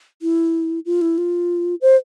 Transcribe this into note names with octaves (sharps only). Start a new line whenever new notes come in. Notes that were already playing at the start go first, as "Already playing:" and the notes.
E4
F4
E4
F4
C5